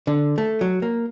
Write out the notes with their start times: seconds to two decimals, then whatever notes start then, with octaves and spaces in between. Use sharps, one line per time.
0.07 D3
0.38 A3
0.61 F#3
0.82 A#3